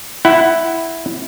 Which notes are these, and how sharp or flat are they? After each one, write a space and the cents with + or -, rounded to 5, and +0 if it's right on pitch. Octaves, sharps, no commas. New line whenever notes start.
E4 +0 F#5 +15